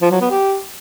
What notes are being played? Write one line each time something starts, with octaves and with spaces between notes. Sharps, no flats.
F3
F#3
B3
G4